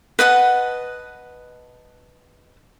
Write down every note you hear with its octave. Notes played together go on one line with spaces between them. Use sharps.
B4 D#5 F#5 A5